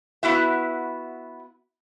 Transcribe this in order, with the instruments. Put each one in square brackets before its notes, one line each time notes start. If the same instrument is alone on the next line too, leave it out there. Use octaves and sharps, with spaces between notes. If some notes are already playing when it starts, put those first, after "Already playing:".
[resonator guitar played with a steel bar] B3 E4 F#4 E5